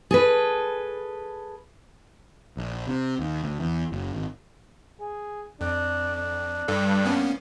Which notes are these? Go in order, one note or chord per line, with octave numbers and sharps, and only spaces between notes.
G#4 A4 B4
A#1
C3
D#2
D2
E2
F#1
G#1
G#4
F2 D4
D4
G2 A4
A#3 B3 C#4